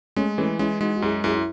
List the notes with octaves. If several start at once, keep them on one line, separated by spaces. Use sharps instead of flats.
G#3 A3 C#4
E3 A3 C#4
G#3 C#4 E4
G#3 D#4 F#4
F#4
F#2 E4 G#4
F#2 E4 G#4
E4